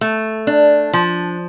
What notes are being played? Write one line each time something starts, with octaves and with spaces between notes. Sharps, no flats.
A3
D4
F3